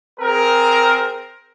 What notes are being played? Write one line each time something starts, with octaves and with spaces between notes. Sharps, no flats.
C4 G#4 A#4